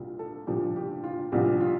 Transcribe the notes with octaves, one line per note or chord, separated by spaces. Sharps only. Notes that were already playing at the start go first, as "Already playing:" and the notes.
Already playing: C2 A#2 F4 G4
A4
C2 A#2 F3 G4
G4
F4
C2 A#2 F3 G4
F4